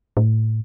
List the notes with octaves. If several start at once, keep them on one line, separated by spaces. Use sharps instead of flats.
A2